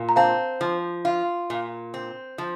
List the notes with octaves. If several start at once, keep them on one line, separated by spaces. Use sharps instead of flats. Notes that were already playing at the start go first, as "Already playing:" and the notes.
Already playing: A#2
A#5
C4 F5 A5
F3
F4
A#2
C4
F3